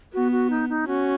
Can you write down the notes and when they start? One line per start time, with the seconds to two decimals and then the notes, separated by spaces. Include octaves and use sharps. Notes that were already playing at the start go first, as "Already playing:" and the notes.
0.14 B3 F#4
0.32 F#4
0.50 D#4
0.69 D#4
0.87 C#4 F#4